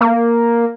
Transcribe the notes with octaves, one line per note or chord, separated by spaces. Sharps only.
A#3